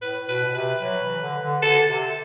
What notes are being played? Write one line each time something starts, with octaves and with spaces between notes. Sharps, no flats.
A2 B4
B2 B4
B2
C3 B4
F#3
E3
D3
D3
D3 A4
C3